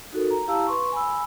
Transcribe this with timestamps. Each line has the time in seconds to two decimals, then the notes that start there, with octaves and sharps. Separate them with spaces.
0.13 D#4 F#4 A4 A#4
0.30 A#5
0.48 E4 G4 F5 A5 A#5 E6
0.67 B4 C6 C#6
0.92 G#5 B5 E6